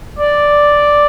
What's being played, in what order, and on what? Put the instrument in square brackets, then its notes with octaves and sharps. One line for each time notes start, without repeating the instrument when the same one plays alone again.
[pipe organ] D5